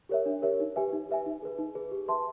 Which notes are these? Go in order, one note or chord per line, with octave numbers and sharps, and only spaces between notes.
G4 A#4 C#5 E5
D4
G4 A#4 C#5 E5
D#4
G4 B4 E5 G#5
D#4
G4 B4 E5 G#5
D#4
G#4 B4
D#4
G#4 B4
G4
B4 E5 A5 C6